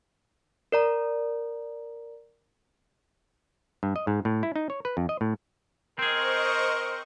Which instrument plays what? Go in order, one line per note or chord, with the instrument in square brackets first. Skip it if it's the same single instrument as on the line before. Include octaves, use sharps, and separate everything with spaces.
[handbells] A#4 D5 A#5
[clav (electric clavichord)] G2
D#5
G#2
A2
E4
D#4
C#5
B4
F2
D#5
A2
[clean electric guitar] C4 G#4 [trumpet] A#4 [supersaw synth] C5 D#5 C#6